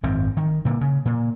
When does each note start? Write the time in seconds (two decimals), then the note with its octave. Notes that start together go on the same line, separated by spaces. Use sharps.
0.03 G#1 F#2 C4
0.37 D#3
0.65 A#2 D3
0.81 C#3
1.05 A#2